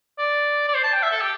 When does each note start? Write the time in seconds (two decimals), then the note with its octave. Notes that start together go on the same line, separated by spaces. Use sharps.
0.19 D5
0.68 D5
0.74 C5
0.83 A5
0.93 G5
1.03 E5
1.11 A4
1.21 G4